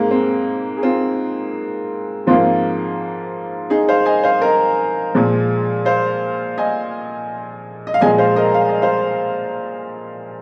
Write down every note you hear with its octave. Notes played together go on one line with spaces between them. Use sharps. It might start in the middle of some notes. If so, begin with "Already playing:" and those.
Already playing: G#2 G#3 A#3 C4
C4
G#4
C4 F4
G#2 F3 A#3 C4 F4
D#4 G#4
C5 F5
D#5 G#5
C5 F5
A#4 D#5
A#2 F3 G#3
C5 F5
D#5 G#5
D#5
F5
A#2 F3 G#3 D#5 G#5
C5 F5
A#4 D#5
F5
D#5
C5 F5